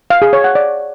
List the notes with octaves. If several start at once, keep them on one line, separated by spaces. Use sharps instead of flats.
F5
G#4
C#5
F#5
D5